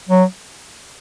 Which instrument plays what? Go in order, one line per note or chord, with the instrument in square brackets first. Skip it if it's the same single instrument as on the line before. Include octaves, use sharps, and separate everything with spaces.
[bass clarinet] F#3